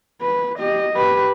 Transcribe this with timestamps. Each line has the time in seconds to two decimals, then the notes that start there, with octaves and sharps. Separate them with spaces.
0.21 B4
0.59 G4 D#5
0.94 G4 B4